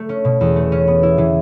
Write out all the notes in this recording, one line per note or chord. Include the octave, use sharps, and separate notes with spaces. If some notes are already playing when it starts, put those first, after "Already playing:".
Already playing: A3
C#4
B2
E2
A3
C#4
B3
E4
E3